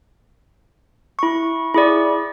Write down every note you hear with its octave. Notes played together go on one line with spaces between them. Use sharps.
E4 C#6
E4 G#4 D5